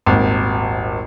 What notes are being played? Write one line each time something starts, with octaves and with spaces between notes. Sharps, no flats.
D#1 G#1